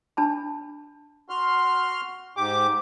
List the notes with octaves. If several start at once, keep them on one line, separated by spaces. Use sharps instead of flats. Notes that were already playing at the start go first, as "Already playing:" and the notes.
D4 A5 B5
F#4 C6 F6
G#2 G4 D6